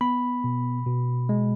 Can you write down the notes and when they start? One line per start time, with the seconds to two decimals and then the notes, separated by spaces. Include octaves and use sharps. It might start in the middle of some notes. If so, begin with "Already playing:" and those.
0.01 B3 B5
0.44 B2
0.86 B2
1.29 G#3